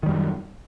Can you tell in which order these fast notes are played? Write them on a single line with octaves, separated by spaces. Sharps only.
D#3 G3 F#2